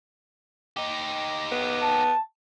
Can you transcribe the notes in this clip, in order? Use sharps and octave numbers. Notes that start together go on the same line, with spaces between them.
D#4 G4
B3
A5